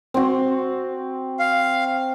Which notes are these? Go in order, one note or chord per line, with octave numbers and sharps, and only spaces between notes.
C4 F#4
F5